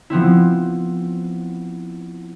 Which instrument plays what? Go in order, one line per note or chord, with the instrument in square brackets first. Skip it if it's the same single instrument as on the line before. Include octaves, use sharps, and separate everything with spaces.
[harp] F3 B3 C4 E4